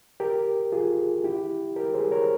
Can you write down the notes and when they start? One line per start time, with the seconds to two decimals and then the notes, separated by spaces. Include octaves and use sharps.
0.20 G4 A#4
0.72 F4 G#4
1.24 E4 G4
1.76 G4 A#4
1.94 G#4 C5
2.11 A#4 C#5